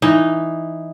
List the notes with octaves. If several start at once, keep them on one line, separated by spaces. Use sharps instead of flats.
E3 D#4